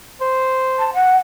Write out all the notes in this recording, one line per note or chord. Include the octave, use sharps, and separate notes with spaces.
C5
A5
F#5